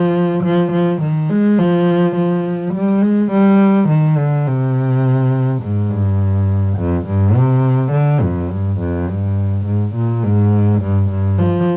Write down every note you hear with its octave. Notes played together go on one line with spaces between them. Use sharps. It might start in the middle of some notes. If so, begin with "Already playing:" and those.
Already playing: F3
F3
F3
D#3
G#3
F3
F3
G3
G#3
G3
D#3
D3
C3
G#2
G2
F2
G2
C3
D3
F2
G2
F2
G2
G#2
A#2
G#2
G2
G2
F3